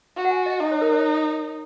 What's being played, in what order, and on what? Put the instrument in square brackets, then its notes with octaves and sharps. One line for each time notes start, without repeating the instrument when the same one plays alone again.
[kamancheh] F#4
[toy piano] F#5
G#5
D#5
[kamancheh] D#4 [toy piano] D#5
[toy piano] C#5
A#4
C#5